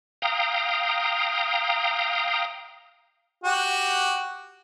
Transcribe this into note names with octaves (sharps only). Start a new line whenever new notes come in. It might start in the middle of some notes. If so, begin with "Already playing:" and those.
F5 G5 A#5 D#6
F#4 G4